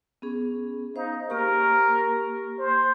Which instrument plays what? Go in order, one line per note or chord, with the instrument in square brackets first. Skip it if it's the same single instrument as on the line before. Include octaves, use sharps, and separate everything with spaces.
[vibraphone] B3 C#4 G#4
[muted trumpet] D#4 [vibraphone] C5 F5
[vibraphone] A#3 G4 C#6 [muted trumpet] A#4
[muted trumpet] C5